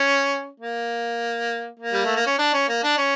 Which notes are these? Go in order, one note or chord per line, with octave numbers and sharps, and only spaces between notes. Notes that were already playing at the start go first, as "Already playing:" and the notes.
Already playing: C#4
A#3
A#3
G3
A3
A#3
C#4
D4
C#4
A#3
D4
C#4